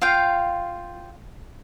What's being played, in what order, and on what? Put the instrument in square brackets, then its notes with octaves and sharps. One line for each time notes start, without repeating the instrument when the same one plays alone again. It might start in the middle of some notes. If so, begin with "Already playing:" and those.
[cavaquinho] F4 F5 G5